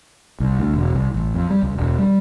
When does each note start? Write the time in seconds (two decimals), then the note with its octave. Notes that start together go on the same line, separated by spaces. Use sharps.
0.40 C2
0.59 D2
0.74 E1
0.95 C2
1.14 A1
1.34 F2
1.50 G3
1.63 C#2
1.78 E1
1.99 G3